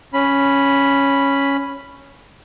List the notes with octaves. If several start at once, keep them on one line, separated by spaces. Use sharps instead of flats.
C#4 B5